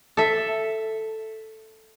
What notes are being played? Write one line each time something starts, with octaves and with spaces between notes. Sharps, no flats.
A4 E5